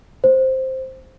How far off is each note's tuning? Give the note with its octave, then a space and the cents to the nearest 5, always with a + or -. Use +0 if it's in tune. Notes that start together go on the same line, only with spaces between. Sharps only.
C5 +5